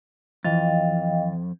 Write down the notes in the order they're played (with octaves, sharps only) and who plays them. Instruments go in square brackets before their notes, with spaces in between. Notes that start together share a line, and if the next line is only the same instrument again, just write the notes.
[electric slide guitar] F2 [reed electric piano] E3 A6 [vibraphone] D#5 F5 G5